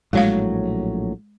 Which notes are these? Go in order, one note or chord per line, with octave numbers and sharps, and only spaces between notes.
A#1 A2 F#3 G#3 F5